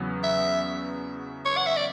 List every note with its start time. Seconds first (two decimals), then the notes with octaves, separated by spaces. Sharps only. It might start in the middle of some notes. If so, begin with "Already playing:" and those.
Already playing: E2 C#3 F#3 B3
0.23 E5
1.45 C#5
1.57 F#5
1.66 E5
1.77 D5